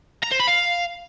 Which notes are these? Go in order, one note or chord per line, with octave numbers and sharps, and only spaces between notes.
A#5
C5
B5
F5